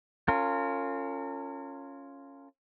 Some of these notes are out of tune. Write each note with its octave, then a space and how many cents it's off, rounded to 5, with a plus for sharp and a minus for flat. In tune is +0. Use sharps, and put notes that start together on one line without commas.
C#4 +0 F4 +0 A#4 -40